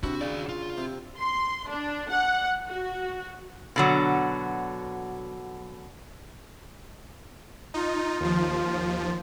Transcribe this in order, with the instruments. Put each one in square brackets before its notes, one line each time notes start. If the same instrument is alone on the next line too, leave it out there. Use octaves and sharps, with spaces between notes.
[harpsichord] C3 E4 [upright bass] D4 [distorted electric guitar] F#4
[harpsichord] C#3 [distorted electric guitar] F#4 D5
[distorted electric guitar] F4
[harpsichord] C3
[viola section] C6
D4
F#5
F#4
[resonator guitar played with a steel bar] B2 D3 F#3
[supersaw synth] D#4 [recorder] F4
[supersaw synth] D#2 F3